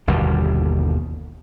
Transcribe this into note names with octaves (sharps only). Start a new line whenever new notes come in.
G1 D#2 B2 G3